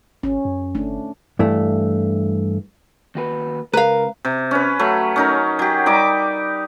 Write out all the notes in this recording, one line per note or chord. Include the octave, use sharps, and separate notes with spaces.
G#1 C#4
F#2
G1 A3 D4
G2 E3 A3
D#2 F#4 B4
C#2 A#4 B4 F5 A#5
C3
C#4 B4
F#3 A3
C#4 D#4 A#4
F#3 G4
G3 D#4 D6